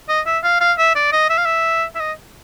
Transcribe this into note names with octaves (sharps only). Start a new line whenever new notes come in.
D#5
E5
F5
F5
E5
D5
D#5
E5
F5
E5
E5
D#5